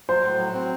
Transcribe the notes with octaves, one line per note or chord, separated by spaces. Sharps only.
F#3 C5
A2
F#3
C4